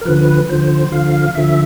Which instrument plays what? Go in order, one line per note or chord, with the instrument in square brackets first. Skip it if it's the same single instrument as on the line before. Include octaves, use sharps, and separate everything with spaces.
[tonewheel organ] A#4
D2 D3 F3 B4
D2 D3 F3 C5
D2 D3 F3 F5
D2 D3 F3 E5